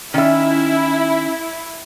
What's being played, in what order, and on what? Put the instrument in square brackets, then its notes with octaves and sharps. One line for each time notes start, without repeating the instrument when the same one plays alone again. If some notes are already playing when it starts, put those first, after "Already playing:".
[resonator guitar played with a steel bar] D#3 E5 [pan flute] C#4 [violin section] E4